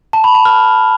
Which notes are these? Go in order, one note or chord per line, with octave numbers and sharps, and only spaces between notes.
A5
B5
A5
F6